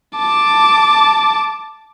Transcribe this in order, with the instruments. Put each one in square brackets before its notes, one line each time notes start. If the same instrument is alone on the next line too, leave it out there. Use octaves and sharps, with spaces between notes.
[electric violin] A5 D6